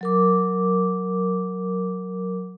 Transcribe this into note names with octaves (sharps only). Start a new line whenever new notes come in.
F#3 A#4 D6